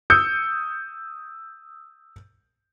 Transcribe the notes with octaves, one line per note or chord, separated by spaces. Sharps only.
D#6 E6 G6 C#7